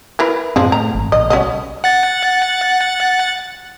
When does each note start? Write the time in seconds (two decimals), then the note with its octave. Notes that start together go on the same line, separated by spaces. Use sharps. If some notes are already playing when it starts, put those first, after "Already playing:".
0.19 E4 A#4 B4
0.56 F#2 A2 F3 G#3 C4 D4
0.72 A2 A#5
0.95 G#1
1.12 A#1 D#5
1.30 C2 C#4 F#4 D#5
1.84 F#5 A6